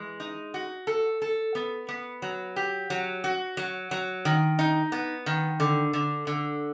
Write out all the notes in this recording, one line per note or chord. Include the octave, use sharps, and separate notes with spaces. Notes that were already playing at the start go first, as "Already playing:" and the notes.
Already playing: E3 G#3
D#4
F#4
A4
A4
B3
B3
F#3
G4
F#3
F#4
F#3
F#3
D#3
D#4
B3
D#3
D3
D3
D3